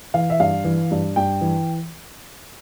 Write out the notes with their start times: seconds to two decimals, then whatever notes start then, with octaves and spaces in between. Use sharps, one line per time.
0.14 E3 F5
0.30 E5
0.40 G2 F5
0.65 E3
0.91 G2
1.16 G2 G5
1.41 E3